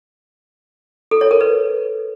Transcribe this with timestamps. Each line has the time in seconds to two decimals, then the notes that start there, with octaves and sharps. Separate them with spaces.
1.11 A4
1.21 C#5
1.31 A#4
1.41 B4